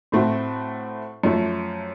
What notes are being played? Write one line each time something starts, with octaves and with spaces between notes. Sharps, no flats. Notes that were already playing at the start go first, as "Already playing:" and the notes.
A2 A3 C4 F#4
F#2 F3 A3